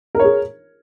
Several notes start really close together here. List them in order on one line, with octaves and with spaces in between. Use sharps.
A#4 C#5 G#4